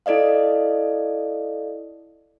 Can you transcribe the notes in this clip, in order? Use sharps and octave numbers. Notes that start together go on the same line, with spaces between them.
E4 A4 D5 D#5 F5